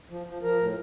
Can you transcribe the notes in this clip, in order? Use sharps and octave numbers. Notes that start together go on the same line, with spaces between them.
F3
F3
F3 A#4
A2